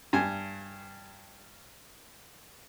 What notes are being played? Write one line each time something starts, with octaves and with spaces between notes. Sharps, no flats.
G2 G#5